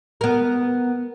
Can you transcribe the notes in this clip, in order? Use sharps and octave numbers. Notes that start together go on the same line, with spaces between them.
B3 A#4